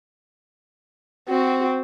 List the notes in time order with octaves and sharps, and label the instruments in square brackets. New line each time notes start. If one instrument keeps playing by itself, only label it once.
[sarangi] C4 [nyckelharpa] F#4